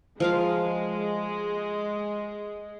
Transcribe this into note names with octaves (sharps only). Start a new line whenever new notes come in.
F3 G#3 A#4 F5